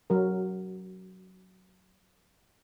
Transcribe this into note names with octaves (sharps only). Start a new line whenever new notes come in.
F#3 A#4